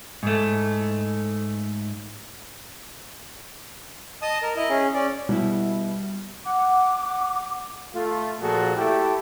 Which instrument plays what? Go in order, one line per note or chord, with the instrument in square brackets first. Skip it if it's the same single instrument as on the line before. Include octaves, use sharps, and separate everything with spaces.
[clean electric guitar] G#2 A3
[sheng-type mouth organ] D#5 A5 D#6
A#4
E4 D#5
C#4 G#4
C#4 D5
[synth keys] B2 E4 [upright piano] G3
[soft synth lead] F#5 [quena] D6
[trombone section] A3 F4
A#2 F3 F#4 G#4 A4
A3 E4 G4